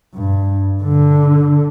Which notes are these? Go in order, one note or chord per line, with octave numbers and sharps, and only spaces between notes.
G2
D3